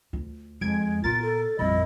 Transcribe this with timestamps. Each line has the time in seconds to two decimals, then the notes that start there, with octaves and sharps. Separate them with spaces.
0.13 D2 F4
0.61 F2 G#3 G#6 D7
1.04 A#2 B3 F4 A#4 A6
1.22 A4
1.59 G#1 F2 A#2 G3 E4 D#5